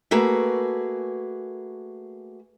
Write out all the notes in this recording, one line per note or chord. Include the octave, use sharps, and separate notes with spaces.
A3 A#3 F#4 G#4 B4